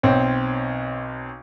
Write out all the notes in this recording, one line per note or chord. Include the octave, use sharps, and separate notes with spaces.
B1 C4 C#5